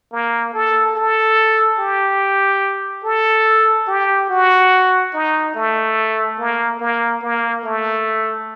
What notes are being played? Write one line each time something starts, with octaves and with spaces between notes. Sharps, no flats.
A#3
A4
A4
G4
A4
G4
F#4
D#4
A3
A#3
A#3
A#3
A3